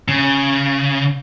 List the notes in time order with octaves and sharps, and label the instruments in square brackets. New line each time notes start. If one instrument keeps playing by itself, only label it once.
[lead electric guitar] C#3